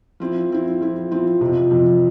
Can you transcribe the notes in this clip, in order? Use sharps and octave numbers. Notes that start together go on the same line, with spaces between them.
F3 C4 E4
F3 C4 E4
F3 C4 E4
F3 C4 E4
F2 C3 F3
F2 C3 F3